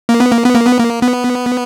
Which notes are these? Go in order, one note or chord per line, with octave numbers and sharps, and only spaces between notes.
A#3
B3
A#3
B3
A#3
B3
A#3
B3